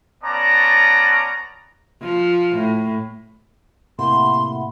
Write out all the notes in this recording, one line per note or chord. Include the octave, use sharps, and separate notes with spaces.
B3 C#4 D5 A5 A#5
F3
A2
A2 C3 A#3 E5 F#5 B5 C6